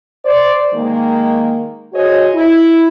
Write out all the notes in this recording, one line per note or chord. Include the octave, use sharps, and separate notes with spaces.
C5 D5
D#3 G#3 A#3
F#4 G#4 C5 C#5 D#5
E4